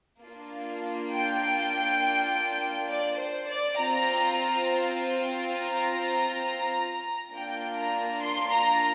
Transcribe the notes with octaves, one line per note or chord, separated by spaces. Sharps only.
A#3 D4 F4
G5
D5
C5
D5
C4 F4 A#5
A#5
A#3 D4 F4 G5
A#5
C6
A#5